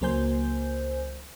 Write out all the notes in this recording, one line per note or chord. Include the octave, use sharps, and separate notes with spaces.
C#2 F#3 A#3 C5 G#5 G6